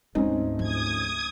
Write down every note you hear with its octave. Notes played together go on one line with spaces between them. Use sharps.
D2 G#2 G#3 A3 C4 C#4 D#4
F3 D4 D#6 G#6